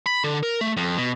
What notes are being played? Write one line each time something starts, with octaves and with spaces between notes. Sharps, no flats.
B5
D3
A#4
A3
F2
B2